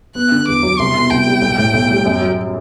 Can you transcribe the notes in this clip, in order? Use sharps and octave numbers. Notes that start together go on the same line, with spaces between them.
B3 F#6
D3
E2 D6
F#3
C2 C6
B2
C2 G5
G3
B1
A2
B1
G3
F#2
F#3